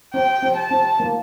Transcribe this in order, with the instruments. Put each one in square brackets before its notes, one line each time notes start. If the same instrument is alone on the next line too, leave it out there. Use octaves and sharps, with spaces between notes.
[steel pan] C4 [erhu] G5
[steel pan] C4
[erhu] A5
[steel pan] C4
A#3